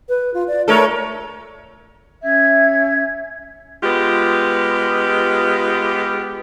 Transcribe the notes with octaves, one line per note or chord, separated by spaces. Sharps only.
B4
F4
D5
A3 A4 A#4 C#5
C#4 E5 G#6
G#3 B3 F4 G4